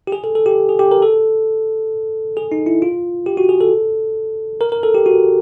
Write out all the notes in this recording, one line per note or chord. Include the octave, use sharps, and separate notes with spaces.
G4
G#4
A4
A4
G4
G#4
G4
A#4
A4
G#4
D#4
E4
F4
G4
F#4
G#4
A4
A#4
A#4
A4
G4
F#4